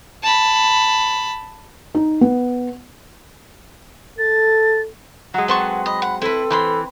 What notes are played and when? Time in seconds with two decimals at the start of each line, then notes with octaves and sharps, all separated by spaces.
0.24 A5 B5
1.95 D#4
2.21 B3
4.19 A4 A6
5.34 F#3 G#3 F#5
5.48 C4 B4 F#5 A5 C6 C#6
5.86 D#5 B5
6.02 F#5
6.22 C4 E4 A4 B4
6.50 E3 C5 B5 C6